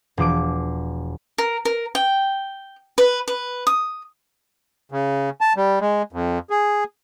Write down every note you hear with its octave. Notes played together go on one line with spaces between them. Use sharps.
E1 F3 D6 D7
A#4
A#4
G5
B4
B4
D#6
C#3
A5
G3
G#3
F2
G#4